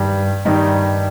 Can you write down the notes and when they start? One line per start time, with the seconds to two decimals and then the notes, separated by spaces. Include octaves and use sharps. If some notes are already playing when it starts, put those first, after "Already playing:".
Already playing: G2 D#3 G3
0.45 G2 D#3 G3 D#4